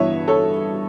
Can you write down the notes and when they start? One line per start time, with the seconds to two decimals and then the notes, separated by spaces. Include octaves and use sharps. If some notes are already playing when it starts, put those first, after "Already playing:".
Already playing: G2 E3 B3 E4 C#5 E5
0.28 A4 C#5